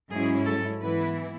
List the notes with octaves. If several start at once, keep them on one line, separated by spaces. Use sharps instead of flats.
G#2 F#3 C#4 E4 G#4
A4
G#2 E3 B3 E4 B4